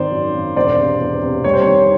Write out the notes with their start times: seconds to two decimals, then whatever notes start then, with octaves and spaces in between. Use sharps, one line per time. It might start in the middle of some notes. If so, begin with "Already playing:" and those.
Already playing: G#1 D#3 C5 D5
0.12 F#2
0.35 G#1
0.56 E1 C5 D5
0.78 C3
1.00 E2
1.23 C3
1.44 G3 C#5
1.54 C5
1.62 C#5
1.66 D#3